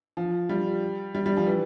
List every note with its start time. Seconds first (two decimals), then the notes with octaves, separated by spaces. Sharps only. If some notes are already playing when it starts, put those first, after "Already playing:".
0.17 F3
0.49 G3
1.15 G3
1.26 G3
1.37 F3
1.47 E3